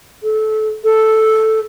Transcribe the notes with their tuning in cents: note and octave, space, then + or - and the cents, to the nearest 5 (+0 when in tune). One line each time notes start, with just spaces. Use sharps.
A4 -20
A4 -5